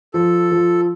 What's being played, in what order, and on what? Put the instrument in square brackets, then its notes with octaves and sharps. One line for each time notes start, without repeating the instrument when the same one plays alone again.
[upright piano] F3 [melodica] A4
[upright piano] F3